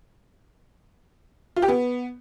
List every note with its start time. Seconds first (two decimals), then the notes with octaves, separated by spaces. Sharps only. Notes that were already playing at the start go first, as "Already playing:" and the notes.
1.56 F4
1.62 G4
1.68 B3